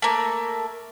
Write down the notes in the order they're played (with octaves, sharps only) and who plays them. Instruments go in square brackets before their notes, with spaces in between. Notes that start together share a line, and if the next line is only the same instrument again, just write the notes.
[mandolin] A3 A#3